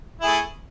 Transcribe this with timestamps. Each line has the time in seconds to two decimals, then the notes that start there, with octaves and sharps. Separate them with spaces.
0.21 E4
0.24 G#4
0.27 A3